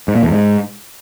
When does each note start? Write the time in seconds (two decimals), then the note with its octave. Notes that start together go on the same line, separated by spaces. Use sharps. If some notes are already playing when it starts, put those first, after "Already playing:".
0.08 G#2
0.15 A#2
0.23 E2
0.30 G#2